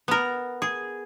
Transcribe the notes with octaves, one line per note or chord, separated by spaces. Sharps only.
B3 A#4
G#4